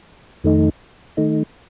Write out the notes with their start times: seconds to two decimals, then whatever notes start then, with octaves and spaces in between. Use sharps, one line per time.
0.44 F2 D#3 A3 D#4
1.17 D#3 A3 D#4